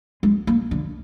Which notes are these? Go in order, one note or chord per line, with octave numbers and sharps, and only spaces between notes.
G#3
A#3
D3